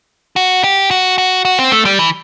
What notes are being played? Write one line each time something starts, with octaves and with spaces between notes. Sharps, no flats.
F#4
G4
F#4
F#4
F#4
C4
A3
G3
E3